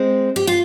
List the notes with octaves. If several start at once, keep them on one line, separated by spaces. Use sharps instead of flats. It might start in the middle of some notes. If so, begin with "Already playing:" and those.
Already playing: G#3 C4
G4
F4